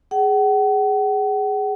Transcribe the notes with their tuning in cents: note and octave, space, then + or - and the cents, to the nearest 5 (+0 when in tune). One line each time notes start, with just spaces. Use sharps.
G#4 +0 F#5 +40